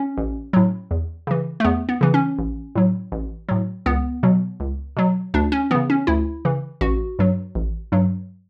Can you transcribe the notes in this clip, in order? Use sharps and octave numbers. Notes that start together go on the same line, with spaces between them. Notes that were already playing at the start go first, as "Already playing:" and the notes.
Already playing: C#4
A1
A2 F#3
E2
C#3 E3
A3
E2 B3
B3
C#3 E3
C#4
A1
A2 F#3
A1
A2 F#3
C#2 B3
B2 F#3
C#2
B2 F#3
D2 D4
C#4
C#3 E3 B3
C#4
D2 E4
C#3 E3
A1 F#4
G2 F#3
A1
G2 F#3